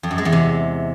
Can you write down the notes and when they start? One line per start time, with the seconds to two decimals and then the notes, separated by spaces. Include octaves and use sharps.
0.03 F2
0.11 F#2
0.18 G#3
0.25 E2
0.32 C3